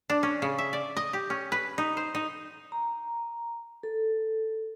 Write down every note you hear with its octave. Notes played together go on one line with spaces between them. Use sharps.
D4
C#4
C#3
E5
D5
D#5
G4
C#4
B4
D#4
C5
D#4
A#5
A4